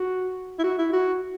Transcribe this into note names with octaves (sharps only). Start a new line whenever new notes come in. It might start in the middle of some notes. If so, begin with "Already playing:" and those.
Already playing: F#4
E4
F#4
E4
F#4